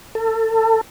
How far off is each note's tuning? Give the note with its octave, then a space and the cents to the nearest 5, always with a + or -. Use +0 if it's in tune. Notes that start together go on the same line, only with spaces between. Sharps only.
A4 +30